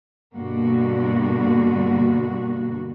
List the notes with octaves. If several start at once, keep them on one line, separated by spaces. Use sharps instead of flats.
G2 B2 D3 A#3 F#4